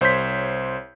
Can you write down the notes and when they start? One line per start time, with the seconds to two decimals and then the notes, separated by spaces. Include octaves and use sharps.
0.01 C2 C5 C#5 C6 G6 B6